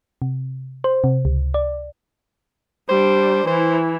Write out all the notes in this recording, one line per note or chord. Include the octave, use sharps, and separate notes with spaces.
C3
C5
C3
C#2
D5
G3 D4 C5
E3 E4 C5